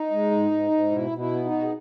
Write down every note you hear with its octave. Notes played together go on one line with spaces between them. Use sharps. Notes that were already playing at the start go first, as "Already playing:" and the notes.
Already playing: D#4
G#3
G#2
G#2
G#2
B2 E4
B2
E4
B3
D#4
B2 F#4
G#4